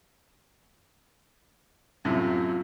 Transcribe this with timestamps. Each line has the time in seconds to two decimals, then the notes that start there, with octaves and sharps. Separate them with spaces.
2.05 F#2 A2 C3 F4